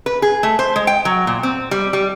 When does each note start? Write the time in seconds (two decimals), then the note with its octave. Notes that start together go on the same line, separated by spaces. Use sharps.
0.06 B4
0.22 G#4
0.43 A3
0.59 C5
0.76 G#3
0.87 G5
1.05 F#3
1.27 A#2
1.43 C4
1.71 G3
1.93 G3